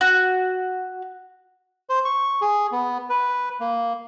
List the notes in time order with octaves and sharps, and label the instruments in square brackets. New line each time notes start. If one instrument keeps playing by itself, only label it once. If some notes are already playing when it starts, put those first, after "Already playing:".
[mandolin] F#4
[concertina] C5
C#6
G#4
B3
B4
A#3